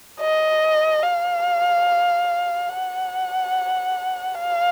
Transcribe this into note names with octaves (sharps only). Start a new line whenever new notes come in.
D#5
F5
F#5
F5